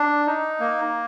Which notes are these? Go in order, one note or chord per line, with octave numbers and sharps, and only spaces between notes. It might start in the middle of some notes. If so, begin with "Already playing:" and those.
Already playing: D4
D#4
A#3